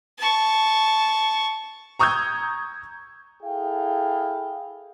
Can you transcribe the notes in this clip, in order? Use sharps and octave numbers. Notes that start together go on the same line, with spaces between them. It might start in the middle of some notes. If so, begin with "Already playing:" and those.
A5 C#6
A#5 C#6 D#6 E6 G6 G#6
E4 G#4 A4 F5 G5